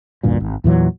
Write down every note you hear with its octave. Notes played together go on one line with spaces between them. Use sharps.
A1 D2 G2 A#2
G#1
E2 A#2 E3 F#3